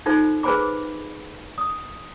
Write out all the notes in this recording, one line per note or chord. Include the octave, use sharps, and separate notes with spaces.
D#4 F4 A4 C5
G#4 B4 C5 G#5 B5 D6
D#6